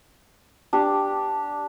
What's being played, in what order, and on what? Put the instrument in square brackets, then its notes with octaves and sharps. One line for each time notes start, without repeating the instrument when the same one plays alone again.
[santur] D4 G4